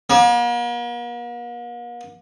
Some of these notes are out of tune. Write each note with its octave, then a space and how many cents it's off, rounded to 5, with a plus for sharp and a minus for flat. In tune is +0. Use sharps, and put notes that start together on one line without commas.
A#3 +45